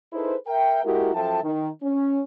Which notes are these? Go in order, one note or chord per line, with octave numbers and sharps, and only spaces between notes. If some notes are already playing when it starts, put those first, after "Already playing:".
D#4 E4 G#4 A4 B4 C5
A#4 E5 G5
G#3 A#3 E4 F#4 G4 A#4
F#2 F3 A4 E5 G5 A5
D#3
C#4